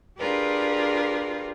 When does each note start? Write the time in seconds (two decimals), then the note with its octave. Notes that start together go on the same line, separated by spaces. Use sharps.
0.18 D4 F4 G4 G#4 A#4 B4